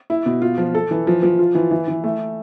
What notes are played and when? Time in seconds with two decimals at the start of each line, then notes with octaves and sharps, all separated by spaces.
0.10 E4
0.26 B2
0.42 F4
0.58 F3
0.75 A4
0.91 E3
1.07 F3
1.23 F3
1.39 F4
1.55 E3
1.71 E3
1.88 E3
2.04 A3